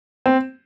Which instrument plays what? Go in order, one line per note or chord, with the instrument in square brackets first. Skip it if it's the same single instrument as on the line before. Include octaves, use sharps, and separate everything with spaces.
[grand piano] C4